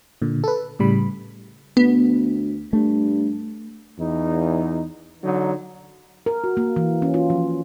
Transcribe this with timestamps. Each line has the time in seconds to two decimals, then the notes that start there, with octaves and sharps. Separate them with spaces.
0.22 A#2 D3
0.44 A4 B4
0.79 A2 C#3 G3 B5
1.77 D2 B3
2.73 G2 A3
3.99 E2 D#4
5.23 D3 F#3 D#4
6.26 A#4
6.44 F#4
6.57 A#3
6.76 E3
7.02 C#4
7.14 F4
7.30 F3